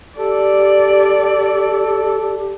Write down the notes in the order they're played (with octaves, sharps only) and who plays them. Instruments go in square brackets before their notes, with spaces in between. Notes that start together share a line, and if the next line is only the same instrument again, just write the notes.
[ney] G4 [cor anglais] A4 [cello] D5